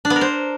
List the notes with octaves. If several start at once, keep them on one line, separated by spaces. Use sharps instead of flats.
D4
B3
A#4
C5